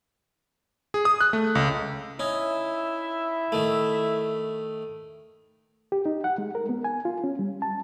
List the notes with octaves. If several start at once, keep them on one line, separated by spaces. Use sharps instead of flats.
G#4
D#6
F#6
A3
C#2
C#4 D#4 E4 E5
D#3 A3
G4
D#4
F#5
G#3
A#4
B3
G#5
F4
C#4
G3
A5